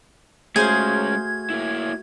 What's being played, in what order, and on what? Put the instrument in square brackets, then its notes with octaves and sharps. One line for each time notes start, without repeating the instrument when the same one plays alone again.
[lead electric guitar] G#3 C#4 [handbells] A3 F#4 [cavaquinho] G#4 C5 F5 [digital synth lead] G#6
[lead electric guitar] A#3 E4